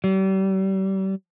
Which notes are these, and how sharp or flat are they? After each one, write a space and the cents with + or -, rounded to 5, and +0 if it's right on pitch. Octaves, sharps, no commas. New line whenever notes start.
G3 -35